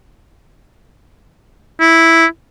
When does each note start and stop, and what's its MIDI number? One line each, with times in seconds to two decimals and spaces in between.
1.80 2.26 64